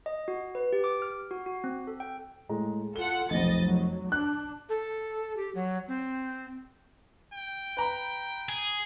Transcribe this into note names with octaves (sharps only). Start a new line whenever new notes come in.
D#5
F#4
B4
G4
D6
F6
F#4
F#4
C4
A4
G5
A2 G#3 A#5
F4 A4 F#5 G7
F1 B1 F2 D#5 A6
F#3
D4 F#6
A4
G4
F#3
C4
G5
B4 A#5 B5
G#4